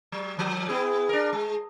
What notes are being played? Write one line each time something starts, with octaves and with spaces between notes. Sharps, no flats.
F#3
D#2 F3
B3 E4 G#4
D4 A#4
G#3